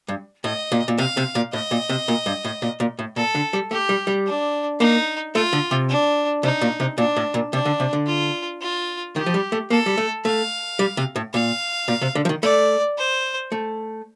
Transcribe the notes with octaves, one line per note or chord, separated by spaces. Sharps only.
G2
A2 D#5
A#2
A#2
C3 F5
C3
A#2
A2 D#5
A#2
C3
A#2
G2
A2
A#2
A#2
A2
A#2 A4
D3
G3
A3 G4
G3
G3
D4
A#3 D#4
A3 F4
D3
C3
D4
C3 D#4
A#2
C3
A#2 D4
A2
A#2
C3 D4
D3
C3
D3
F4
F4
D#3 G4
F3
G3
A3
A#3 A4
G3
A3
A3 F5
G3
C3
A2
A#2 F5
A#2
C3
D3
F3
D#3
A3 D5
C5
A3